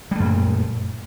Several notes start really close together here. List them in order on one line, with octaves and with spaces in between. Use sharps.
G3 A3 F#2 A#2